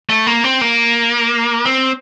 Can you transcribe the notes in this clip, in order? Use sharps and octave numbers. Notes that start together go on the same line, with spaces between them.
A3
A#3
C4
A#3
C4